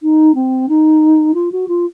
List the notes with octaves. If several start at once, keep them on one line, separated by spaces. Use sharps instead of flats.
D#4
C4
D#4
F4
F#4
F4